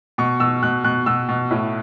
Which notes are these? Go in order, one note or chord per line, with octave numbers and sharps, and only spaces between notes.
B2 C#6
B2 E6
B2 F#6
B2 F#6
B2 E6
B2
A2